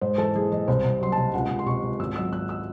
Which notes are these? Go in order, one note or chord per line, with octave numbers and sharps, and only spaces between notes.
G#2 C5
E3 A4
E3 G#4
E3 D#5
C2 C5
C2
F#3 C6
A5
C3
C#2 F#5
C#2
C6
C3 C#6
C#2
G#1 E6
F#3 E6
G#1 F#6
E6